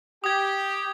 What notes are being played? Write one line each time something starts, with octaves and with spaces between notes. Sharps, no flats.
G4 D#6 G#6